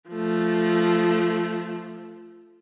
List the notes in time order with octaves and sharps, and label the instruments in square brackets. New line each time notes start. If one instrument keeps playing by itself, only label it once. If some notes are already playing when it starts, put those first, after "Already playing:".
[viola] F3 A3